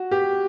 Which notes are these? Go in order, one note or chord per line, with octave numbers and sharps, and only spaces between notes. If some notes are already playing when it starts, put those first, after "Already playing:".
Already playing: F#4
G4